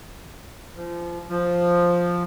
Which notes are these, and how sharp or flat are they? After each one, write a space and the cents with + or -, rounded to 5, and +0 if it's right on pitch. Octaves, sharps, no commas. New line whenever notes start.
F3 -25
F3 +5